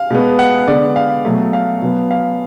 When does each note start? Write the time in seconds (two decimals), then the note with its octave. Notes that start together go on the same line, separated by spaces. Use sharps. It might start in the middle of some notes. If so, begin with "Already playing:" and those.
Already playing: F5
0.10 B2 G#3 B3
0.39 F#5
0.68 D3 G#3 B3 D5
0.96 F5
1.25 B2 F#3 A3
1.53 F5
1.82 B2 F#3 B3
2.11 F5